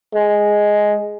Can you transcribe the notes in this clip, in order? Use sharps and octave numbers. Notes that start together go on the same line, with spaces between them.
G#3